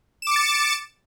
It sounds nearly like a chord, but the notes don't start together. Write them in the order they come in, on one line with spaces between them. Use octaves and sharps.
E7 D6 C#7 A6